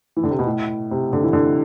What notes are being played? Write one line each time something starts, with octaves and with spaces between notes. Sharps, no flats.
E3
D3
C3
B2
A2
C3
D3
E3
D3